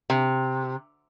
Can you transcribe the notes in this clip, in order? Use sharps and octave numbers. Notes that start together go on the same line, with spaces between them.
C3